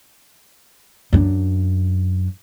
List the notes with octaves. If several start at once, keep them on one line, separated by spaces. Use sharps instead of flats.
F#2 D4